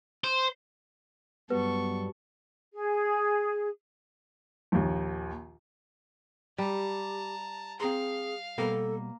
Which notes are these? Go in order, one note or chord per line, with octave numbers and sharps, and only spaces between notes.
C5
G2 F#3 G3 B3 A4 B4 C#6
G#4
A#1 D#2
G3 G4 A5 A#5
C4 G#4 F5 A#5 C6
B2 G3 A#3 B3 A4